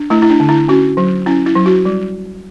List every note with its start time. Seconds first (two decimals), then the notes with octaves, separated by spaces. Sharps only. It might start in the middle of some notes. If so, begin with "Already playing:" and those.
Already playing: D4
0.10 A3 E4
0.22 E4
0.30 D4
0.40 D3
0.49 E4
0.68 C#4 F#4
0.97 F#3
1.26 C#4 E4
1.46 E4
1.56 F#3
1.66 F#4
1.85 G3